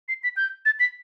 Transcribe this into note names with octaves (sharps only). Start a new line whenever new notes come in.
C7
B6
G6
A6
B6